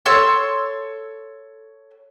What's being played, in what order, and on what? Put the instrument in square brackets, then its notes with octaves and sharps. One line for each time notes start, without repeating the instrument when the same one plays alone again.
[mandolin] A4 C#5 C6 E6